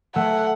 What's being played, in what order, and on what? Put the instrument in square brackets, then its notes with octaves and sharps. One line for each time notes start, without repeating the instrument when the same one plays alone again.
[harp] A3 [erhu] F#5